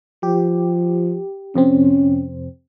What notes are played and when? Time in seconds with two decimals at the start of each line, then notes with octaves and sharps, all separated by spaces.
0.23 F3 G4
1.56 F2 C3 C4 C#4